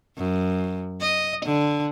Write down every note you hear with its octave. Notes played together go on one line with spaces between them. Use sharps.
F#2
D#5
D3